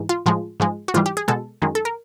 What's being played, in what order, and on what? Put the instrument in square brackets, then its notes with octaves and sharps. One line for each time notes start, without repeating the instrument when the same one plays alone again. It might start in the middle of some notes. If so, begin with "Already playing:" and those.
Already playing: [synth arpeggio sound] G#2 E3
F4
A2 F3 G#3 F4
G#2 F3 G#3
F#4
G#2 E3 G3 F4
G4
G#4
B2 G#3 A4
F#2 D#3 G#3
A4
A#4